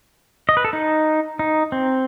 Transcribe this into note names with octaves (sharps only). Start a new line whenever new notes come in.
D#5
B4
A4
D#4
D#4
C4